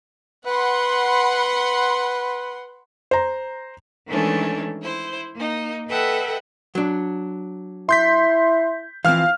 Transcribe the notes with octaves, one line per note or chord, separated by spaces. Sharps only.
B4 F#5 B5 C6
C5 A#5
D#3 E3 G#3 A3 C#4 D4
E4 C5
A#3 D#4
A4 B4 D#5 E5 F#5 G5
F#3 D4
E4 C6 G6 B6
E3 F3 C4 F5 F6